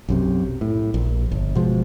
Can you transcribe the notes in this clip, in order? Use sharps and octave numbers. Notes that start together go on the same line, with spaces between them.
B1 F#2 C3
A2
A#1
G1
B2 F3 G#3